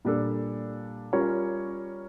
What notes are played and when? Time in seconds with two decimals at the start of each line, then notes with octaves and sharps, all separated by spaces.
0.05 A#2 G3 D4 A4
1.13 G3 C#4 F4 A#4 C#5